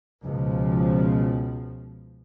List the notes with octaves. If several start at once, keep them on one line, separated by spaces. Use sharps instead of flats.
C#2 B2 F3